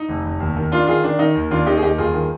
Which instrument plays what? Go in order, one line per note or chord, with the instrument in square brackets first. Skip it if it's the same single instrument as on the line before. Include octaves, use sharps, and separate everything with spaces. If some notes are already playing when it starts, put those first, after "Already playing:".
Already playing: [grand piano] D#4
F1
F1
D#2
D#3
D#3 D4 F4
D#3 F4 G#4
D#3 D4
D#3 D#4
D#2
D#2 D4 F4
D#3 D#4 G4
G#4
D#2 D#4 G4
G1 F4 G#4
D#3